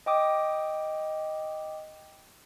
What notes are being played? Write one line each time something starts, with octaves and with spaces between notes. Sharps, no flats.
D#5 G5 D6 D#6